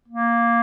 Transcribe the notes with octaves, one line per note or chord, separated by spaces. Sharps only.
A#3